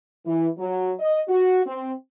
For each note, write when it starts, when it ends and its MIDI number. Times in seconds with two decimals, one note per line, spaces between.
0.25 0.47 52
0.58 0.92 54
0.98 1.20 75
1.27 1.61 66
1.66 1.93 60